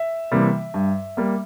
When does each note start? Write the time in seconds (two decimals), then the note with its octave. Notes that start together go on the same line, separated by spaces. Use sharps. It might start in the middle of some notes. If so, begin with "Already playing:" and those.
Already playing: E5
0.32 C3 E3 G3 A#3
0.74 G2
1.17 G3 A#3